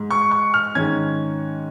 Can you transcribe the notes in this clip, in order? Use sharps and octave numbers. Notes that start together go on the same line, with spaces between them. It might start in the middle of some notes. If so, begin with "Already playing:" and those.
Already playing: G#2 G#3
C#6
C#6
F6
G#2 D#3 C#4 G#6